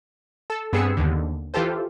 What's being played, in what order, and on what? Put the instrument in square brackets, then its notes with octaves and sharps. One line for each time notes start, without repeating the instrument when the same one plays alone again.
[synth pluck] A4 E6
G2 B3 C4 G#4 E6 C#7
D#2 D3
E3 F4 G4 A4 C5